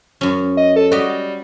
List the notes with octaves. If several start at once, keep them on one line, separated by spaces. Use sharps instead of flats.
F#2 C#4
D#5
A4
G3 F#4 G4 D#5
G3